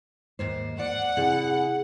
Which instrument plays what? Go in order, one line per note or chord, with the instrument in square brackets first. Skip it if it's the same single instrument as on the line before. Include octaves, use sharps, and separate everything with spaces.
[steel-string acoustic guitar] D#2 G#2 C5
[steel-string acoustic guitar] D5 [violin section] F#5
[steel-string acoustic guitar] C3 [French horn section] E4 G#4